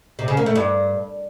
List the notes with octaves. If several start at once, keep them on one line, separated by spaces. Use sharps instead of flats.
C3
C#3
A#3
A3
G2